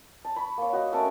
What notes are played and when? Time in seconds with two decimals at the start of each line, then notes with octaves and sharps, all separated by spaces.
0.24 A5
0.36 B5 C#6
0.58 A#3 C#5
0.73 F#4 D#5
0.92 A3 C#4 A#4 A5